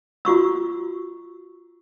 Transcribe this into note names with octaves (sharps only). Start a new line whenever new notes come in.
F4 F#4 C#6 E6